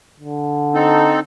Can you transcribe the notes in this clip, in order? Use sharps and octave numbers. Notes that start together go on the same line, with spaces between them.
D3
C4 D#4 A4